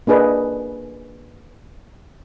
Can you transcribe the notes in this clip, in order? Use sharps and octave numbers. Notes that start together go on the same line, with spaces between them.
A#3 D4 G#4 B4 D#5